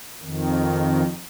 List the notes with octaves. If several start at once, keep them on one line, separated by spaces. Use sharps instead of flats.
F2 D#3